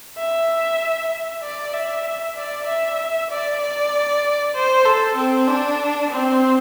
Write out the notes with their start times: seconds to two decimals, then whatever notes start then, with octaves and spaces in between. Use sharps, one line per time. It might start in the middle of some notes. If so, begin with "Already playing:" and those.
0.18 E5
1.43 D5
1.73 E5
2.36 D5
2.67 E5
3.30 D5
3.61 D5
4.55 C5
4.85 A4
5.17 C4
5.47 D4
6.11 C4